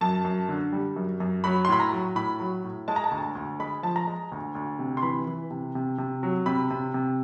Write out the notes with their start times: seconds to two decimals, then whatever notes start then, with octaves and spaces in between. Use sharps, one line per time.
0.01 F#2 A5
0.24 F#2
0.49 D3
0.72 G3
0.96 F#2
1.20 F#2
1.44 F#3 B5
1.65 C6
1.69 A2 B5
1.80 A#5
1.92 F#3
2.15 A2 B5
2.40 F#3
2.64 A2
2.88 G#3 A5
2.96 A#5
3.04 A5
3.11 D2
3.35 D2
3.60 G#3 B5
3.83 F3 A5
3.96 A#5
4.07 G#3
4.32 D2
4.55 D2
4.79 C3
4.97 C6
5.02 E3 B5
5.27 E3
5.51 C3
5.75 C3
5.98 C3
6.23 F#3
6.46 C3 B5
6.70 C3
6.94 C3